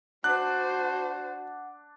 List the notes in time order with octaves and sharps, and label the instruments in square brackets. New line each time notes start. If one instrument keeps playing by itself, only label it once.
[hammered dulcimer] D4 [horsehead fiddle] F#4 C5 [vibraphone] F#5 [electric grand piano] F#6